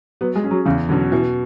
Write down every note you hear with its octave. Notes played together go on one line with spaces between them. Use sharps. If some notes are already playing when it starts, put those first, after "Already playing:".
F#3 B3
G#3
C#4 G#4
F#3
E2 C#3
B2 D3 F#3 C#4
B2 E3